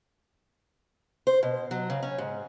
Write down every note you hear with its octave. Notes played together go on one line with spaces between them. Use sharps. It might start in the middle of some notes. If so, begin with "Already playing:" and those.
C5
B2
F#3
C#3
C#4
G#2